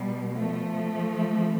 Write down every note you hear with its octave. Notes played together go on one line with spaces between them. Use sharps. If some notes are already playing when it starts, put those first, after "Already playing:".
Already playing: B2 G3
F3 A3
C3 E3